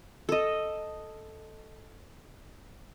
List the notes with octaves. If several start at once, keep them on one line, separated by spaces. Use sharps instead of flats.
A4 D#5